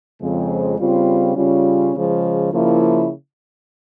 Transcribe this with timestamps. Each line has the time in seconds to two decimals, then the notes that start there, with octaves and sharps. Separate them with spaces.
0.20 F2 C#3 F3 G#3 C4
0.78 C#3 G3 C4 F4
1.36 C#3 G3 C#4 F4
1.94 C#3 F3 G#3
2.52 C#3 F3 A#3 E4